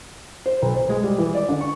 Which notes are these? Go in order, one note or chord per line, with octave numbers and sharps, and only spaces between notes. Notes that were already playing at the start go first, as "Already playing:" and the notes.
C5
B1
C5
G#3
G3
E3
D5
D3
C#6